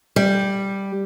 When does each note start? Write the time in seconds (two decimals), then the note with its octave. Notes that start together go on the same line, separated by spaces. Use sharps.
0.16 G3